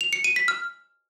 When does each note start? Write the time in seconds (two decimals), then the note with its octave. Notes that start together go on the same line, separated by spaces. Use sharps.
0.01 F7
0.13 C#7
0.24 D#7
0.36 B6
0.48 F6